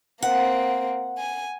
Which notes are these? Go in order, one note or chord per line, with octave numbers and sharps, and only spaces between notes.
A#3 C4 F#5
G#5